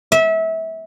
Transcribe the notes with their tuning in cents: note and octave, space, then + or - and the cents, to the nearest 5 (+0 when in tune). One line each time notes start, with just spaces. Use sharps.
E5 -25